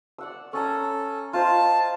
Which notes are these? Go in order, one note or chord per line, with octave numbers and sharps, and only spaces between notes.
D5 F#5 E6
C#4 A4 G#5 A#5
F4 C5 D#5 A5